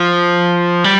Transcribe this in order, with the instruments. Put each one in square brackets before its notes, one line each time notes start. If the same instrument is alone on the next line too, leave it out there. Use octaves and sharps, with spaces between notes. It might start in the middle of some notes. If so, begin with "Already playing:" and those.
Already playing: [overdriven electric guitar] F3
G3